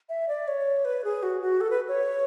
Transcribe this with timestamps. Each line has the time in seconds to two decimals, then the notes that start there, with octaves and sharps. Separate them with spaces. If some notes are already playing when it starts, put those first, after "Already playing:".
0.09 E5
0.28 D5
0.48 C#5
0.85 B4
1.04 G#4
1.23 F#4
1.41 F#4
1.61 A4
1.70 B4
1.88 C#5